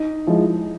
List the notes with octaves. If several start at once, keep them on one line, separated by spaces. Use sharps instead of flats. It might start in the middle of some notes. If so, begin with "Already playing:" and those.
Already playing: D#4
F3 G#3 E4